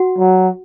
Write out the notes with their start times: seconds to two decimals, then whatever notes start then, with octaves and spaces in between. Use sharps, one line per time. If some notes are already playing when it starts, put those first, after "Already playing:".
Already playing: F#4 F#5
0.18 F#3